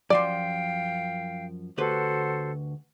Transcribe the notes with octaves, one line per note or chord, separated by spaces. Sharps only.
F#2 F3 D5 F5 G5 C6
D2 F#4 G4 A4 B4 C5